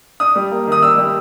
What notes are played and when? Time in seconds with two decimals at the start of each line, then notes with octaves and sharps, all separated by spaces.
0.20 D4 D#6
0.36 G3
0.51 A#3
0.67 D#3 D#6
0.82 D4 E6
0.98 G3